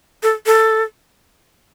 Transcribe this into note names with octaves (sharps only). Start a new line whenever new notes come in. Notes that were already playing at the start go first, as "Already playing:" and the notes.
A4
A4